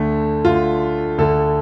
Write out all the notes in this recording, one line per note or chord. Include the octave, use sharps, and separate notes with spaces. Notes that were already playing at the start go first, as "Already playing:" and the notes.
Already playing: D2 D3 A3
D2 D3 F4
D2 D3 A4